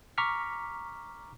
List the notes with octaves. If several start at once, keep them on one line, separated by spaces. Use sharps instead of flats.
A#5 C#6 D6 F6 B6